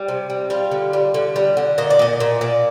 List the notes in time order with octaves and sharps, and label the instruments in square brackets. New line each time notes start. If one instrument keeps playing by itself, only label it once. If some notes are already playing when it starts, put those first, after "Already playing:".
Already playing: [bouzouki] G3
C3
G3
G3 F4
D3
G3
D3
G3
D3
A#2 D#5
D5
A#2 D#5
A#2
A#2 D5